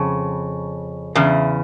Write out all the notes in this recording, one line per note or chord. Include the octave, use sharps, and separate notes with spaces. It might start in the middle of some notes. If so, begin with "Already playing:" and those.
Already playing: F2 C#3
E2 C#3